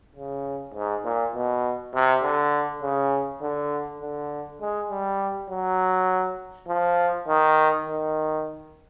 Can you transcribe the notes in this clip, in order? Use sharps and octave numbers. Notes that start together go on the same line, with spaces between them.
C#3
G#2
A#2
B2
C3
D3
C#3
D3
D3
G#3
G3
F#3
F3
D#3
D#3